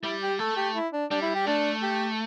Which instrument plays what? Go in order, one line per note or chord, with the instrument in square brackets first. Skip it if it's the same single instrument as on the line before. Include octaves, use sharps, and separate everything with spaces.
[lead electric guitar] G3 [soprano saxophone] E4
[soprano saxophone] G4
[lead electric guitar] A3 [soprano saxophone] A4
[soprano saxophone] G4
E4
D4
[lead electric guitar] G3 [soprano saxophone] D4
[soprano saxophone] E4
G4
[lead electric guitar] A3 [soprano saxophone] D4
[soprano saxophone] G4